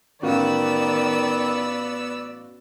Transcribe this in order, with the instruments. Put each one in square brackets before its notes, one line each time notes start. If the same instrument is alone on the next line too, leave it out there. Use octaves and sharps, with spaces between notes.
[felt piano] A1 F#4 F5 [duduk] D#3 [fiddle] B3 E6 [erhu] D5